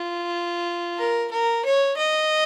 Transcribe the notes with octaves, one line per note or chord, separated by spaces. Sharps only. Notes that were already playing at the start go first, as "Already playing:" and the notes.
Already playing: F4
A#4
A#4
C#5
D#5